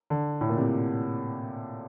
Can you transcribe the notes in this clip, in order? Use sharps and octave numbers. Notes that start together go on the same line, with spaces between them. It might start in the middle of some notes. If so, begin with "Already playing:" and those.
D3
A2
A#2
C3